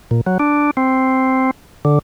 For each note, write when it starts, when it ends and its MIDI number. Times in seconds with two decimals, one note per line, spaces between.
0.11 0.21 46
0.27 0.38 54
0.39 0.71 62
0.77 1.51 60
1.85 1.99 50